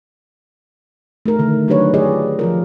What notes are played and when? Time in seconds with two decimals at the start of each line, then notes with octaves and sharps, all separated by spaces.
1.26 A3 D#4 A#4
1.39 D3 D#3
1.68 F#3 D4 G4 B4 C#5
1.94 F4 G4 G#4 D5 D#5
2.39 F3 F4 A#4